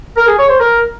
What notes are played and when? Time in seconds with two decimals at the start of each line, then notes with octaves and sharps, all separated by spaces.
0.17 A#4
0.28 G#4
0.39 C#5
0.49 C5
0.60 A#4